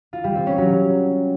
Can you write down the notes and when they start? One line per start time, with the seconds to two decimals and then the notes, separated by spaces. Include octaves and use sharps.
0.13 F4
0.24 G3
0.35 C4
0.47 C#4
0.58 F#3